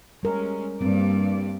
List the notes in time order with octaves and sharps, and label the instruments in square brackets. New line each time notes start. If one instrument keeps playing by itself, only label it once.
[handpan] G3 A#4 [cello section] G#3 C#4
[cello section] G2 A#3 D5 [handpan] G3 C4